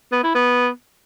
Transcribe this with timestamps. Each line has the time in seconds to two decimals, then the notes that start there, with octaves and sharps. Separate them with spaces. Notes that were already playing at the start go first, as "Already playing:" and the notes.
0.12 B3
0.23 E4
0.35 B3